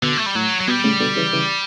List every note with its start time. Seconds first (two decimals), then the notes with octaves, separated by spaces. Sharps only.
0.03 B2 D3
0.17 A3
0.26 G3
0.35 A2 F#3
0.61 F#3
0.68 B2 G3
0.84 A2 C#3
1.00 B2 D3
1.16 C#3 E3
1.33 C#3 E3